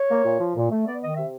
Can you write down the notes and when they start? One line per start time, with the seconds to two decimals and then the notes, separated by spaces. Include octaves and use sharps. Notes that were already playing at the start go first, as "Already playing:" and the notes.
Already playing: C#5
0.10 A#3
0.24 A#2
0.40 F3
0.55 A#2
0.70 A3
0.85 B3 D5
1.01 D#3 D#5
1.16 C3 E5